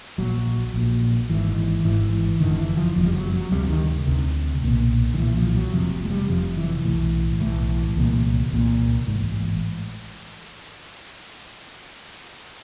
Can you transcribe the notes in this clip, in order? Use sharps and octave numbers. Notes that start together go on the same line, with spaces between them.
A#1 A#2 F#3
A#1 A#2
G#1 G#2 E3
G#1 G#2 E3
F#1 F2 D3 D#3
E3
F3
F#1 F2 D3 F3
G3
F#3
F#3
D2 C3 G3
D#3
D2 C3
B1 A#2
D#3
B1 A#2 E3
F3
F#3
F1 F2 C3 F3
G#3
G3
F1 F2 C3 F3
E3
B1 A2
B1 A2 E3
C2 A#2
C2 A#2
A1 G#2